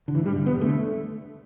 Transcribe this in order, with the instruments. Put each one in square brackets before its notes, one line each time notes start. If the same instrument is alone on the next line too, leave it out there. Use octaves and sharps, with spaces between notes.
[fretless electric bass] D3
A1 E3
G3
G2 D3
E1 B3
D3 A3